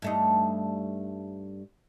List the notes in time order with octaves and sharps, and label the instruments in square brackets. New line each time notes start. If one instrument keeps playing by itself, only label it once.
[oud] G2 A3 D#4